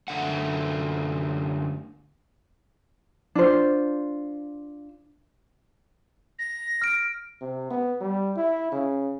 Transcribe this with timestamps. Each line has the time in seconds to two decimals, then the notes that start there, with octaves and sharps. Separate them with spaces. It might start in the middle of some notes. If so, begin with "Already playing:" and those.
0.08 F#2 D3 A3 F#5
3.35 D4 F4 C5
6.39 A#6
6.82 F6 D7
7.41 C3
7.70 B3
8.01 G3
8.37 E4
8.72 C#3